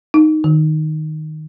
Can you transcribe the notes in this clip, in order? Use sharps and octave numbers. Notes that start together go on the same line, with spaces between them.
D#4
D#3